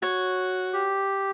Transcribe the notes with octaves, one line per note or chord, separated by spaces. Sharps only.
F#4 C#5
G4